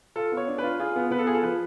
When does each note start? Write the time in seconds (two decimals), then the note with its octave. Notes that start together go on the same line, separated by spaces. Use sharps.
0.16 F4 A4
0.32 B3
0.37 C#5
0.48 D4
0.58 F4 B4
0.80 F4 G#4
0.96 B3
1.11 B3 B4
1.19 A4
1.27 F4 G#4
1.34 A4
1.43 F3 B4